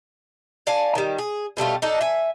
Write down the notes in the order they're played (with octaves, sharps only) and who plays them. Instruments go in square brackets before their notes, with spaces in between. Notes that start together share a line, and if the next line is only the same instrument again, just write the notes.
[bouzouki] D5 F5 G#5 A5
D#3 G3
G#4
B2 G3 A3 F4
D4 D#4 A4
E5 G#5